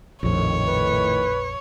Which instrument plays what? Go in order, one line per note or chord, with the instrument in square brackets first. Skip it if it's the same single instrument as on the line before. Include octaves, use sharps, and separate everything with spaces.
[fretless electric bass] A#1 F2 [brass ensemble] A2 D#3 [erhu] C#5
[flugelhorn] B4